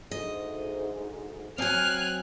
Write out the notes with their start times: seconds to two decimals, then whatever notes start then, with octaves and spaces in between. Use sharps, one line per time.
0.11 D2 G#2 D#5
1.58 F#3 C4 G#5 F6 F#6